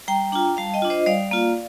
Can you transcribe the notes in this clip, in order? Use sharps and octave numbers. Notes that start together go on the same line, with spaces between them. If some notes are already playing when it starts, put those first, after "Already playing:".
G3 G5 A#5
D4 F4 G5 A#5
G3 F5 A5
D#5 G5
D4 F4
C5 D#5
G3 D5 F5
A#3 F4